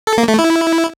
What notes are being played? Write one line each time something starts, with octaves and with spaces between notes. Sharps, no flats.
A4
A#3
A3
E4